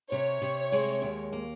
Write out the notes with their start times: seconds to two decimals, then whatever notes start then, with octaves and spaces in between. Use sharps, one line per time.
0.12 C3 C#5
0.42 C3
0.72 G#3
1.02 D#2
1.32 A#3